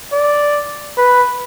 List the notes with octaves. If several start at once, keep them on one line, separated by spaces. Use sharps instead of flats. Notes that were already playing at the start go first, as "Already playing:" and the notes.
D5
B4